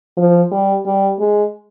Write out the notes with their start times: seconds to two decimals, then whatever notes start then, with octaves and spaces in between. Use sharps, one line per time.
0.17 F3
0.51 G3
0.86 G3
1.20 G#3